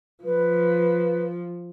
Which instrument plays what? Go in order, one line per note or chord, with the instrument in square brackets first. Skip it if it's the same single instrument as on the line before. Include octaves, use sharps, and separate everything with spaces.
[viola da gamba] F3 [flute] B4